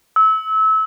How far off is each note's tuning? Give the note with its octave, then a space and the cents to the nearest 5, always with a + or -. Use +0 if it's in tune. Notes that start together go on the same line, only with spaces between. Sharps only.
E6 -25